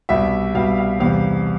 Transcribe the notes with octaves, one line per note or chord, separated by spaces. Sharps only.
C2 B2 G3 E5
C2 B2 G3 F5
F5
E2 C3 G3 F5